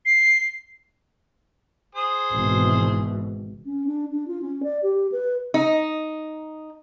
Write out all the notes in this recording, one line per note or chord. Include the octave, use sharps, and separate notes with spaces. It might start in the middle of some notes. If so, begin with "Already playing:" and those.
C7
G#4 C5 D#6
G#1 B2 E3
C#4
D4
D4
F4
C#4
D5
G4
B4
D#4